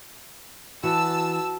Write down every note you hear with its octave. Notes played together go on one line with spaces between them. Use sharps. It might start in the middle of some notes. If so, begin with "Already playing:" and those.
E3 F#4 A5 E6